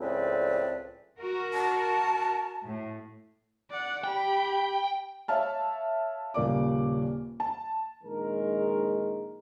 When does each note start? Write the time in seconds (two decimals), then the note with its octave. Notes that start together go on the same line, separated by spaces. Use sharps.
0.01 C#2 A2 F3 C4 B4 D5
1.19 F#4 A#4
1.54 A5
2.64 A2
3.71 D5 F#5
4.04 G4 G5 B5
5.28 C#5 E5 F5 A5 F6
6.34 D#1 C#3 A#3 D5 D6
7.40 A5
8.04 A#1 D#3 G#3 A#4